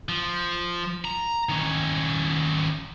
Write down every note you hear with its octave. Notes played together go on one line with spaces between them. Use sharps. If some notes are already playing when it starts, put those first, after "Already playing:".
F3
A#5
D#3 C#4